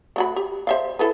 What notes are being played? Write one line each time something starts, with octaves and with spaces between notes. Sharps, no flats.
A3 F#4 B5
G4
C5 E5 F5
E4 A4 B4